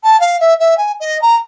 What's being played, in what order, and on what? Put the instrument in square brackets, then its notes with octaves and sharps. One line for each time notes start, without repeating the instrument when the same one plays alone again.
[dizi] A5
F5
E5
E5
G#5
D#5
A#5